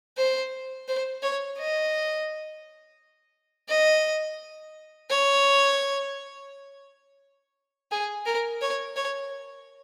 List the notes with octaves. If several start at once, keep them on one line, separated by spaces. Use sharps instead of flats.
C5
C5
C#5
D#5
D#5
C#5
G#4
A#4
C#5
C#5